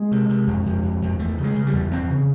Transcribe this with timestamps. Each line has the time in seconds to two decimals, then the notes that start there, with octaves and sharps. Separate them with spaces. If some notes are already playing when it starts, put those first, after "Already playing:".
Already playing: G#3
0.12 C3
0.29 C3
0.47 F2
0.66 F2
0.83 F2
1.02 F2
1.19 E2 A3
1.38 C#3
1.43 G#3
1.55 C#3
1.67 G3
1.73 E2
1.91 E2 C4
2.10 C#3